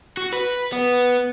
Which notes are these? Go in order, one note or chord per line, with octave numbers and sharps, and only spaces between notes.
F#4
B4
B3